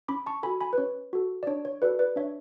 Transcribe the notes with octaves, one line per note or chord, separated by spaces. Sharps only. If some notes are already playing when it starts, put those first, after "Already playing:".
C#4 B5 D6
A5 C#6
F#4 A4 G#5 B5
G#5 B5
B4
C#4 C#5
F#4 A4
D5
D4 C#5
C#5
F#4 A4 B4 D5
B4 D5
D4 C#5 E5